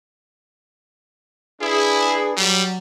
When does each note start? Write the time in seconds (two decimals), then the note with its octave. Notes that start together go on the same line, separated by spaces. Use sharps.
1.61 D4 E4 G#4 B4
2.37 F#3 G3